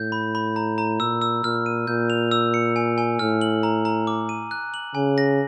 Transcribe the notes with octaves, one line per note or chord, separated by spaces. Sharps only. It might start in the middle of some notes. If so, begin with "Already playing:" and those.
Already playing: A2 G6
B5
B5
A#5
A#5
A#2 E6
E6
A#2 F6
D#7
A#2 G6
F7
E6
C#7
G#5
G#5
A2 F6
F#7
A#5
A#5
D6
D#7
F#6
F#7
C#3 G#5
A#6